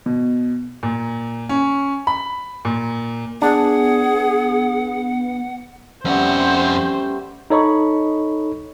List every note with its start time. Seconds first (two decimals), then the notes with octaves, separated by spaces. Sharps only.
0.06 B2
0.83 A#2
1.49 C#4
2.07 B5
2.65 A#2
3.42 B3 D4 G#4 F#5
6.05 F2 G3 A3 B3 C#4 C5 F#5
7.50 D#4 A4 C#5 D#5 B5 C#6